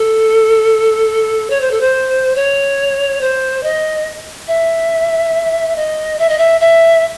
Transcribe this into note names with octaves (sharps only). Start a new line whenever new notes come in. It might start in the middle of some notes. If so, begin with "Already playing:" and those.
Already playing: A4
C#5
C5
A4
C5
C#5
C5
D#5
E5
D#5
E5
D#5
E5
E5